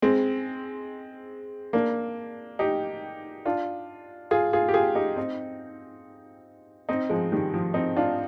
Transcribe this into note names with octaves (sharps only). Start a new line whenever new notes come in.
G#3 C4
A#3 D4
D#4 G4
D4 F4
F4 G#4
F4 G#4
G4
F4 G#4
D#4 G4
C4 D#4
C4 D#4
F3 G#3
D#3 G3
F3
C4 D#4
D4 F4